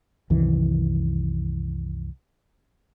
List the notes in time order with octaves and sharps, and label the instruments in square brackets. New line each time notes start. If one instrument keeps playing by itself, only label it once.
[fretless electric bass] C2 F#2 D#3 E3